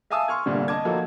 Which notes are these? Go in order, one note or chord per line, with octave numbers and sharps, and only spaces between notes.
E5 F5 G#5 A5 D#6 E6
C6 C#6 F6 G#6
G1 C2 A#2 D3 G3
D#5 A5 D6 G#6
F3 F#3 A#3 D#4 F#4 A4